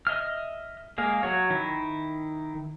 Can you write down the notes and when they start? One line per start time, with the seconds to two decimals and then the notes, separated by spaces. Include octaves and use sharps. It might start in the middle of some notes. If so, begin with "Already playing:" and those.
0.07 D#5 E5 F6
0.98 G#3 A#3 F5
1.23 F#3 F#4 C#5
1.50 D#3 E4